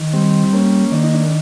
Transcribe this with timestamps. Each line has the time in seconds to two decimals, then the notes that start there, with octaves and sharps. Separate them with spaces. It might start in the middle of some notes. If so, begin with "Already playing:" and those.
Already playing: D#3
0.13 G3 C4
0.53 A#3 C#4
0.92 D#3 D4
1.04 D#4
1.14 D4